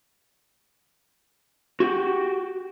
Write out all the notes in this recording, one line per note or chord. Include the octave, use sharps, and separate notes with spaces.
F#4 G4